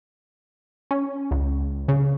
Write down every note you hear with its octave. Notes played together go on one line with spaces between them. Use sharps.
C#4
C#2
C#3